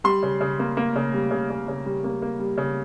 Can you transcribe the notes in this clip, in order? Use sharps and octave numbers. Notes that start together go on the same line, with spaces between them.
G3 C6
C#3
C#3
A#3
A#3
C#3
G3
C#3
C#3
C#3
G3
A#3
A#3
G3
C#3